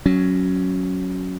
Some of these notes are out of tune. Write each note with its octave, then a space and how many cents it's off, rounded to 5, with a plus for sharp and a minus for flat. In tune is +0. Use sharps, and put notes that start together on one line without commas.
F#3 +0 C#4 +0